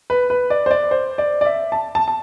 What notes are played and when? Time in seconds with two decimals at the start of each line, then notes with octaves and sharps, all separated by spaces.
0.10 B4
0.30 B4
0.50 D5
0.66 C5
0.71 D5
0.91 C5
1.18 D5
1.41 D5
1.45 E5
1.72 A5
1.95 A5
2.08 A5